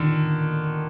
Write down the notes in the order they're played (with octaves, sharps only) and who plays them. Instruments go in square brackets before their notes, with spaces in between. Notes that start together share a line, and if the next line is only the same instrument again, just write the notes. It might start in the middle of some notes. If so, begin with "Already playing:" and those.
Already playing: [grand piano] D3 D#3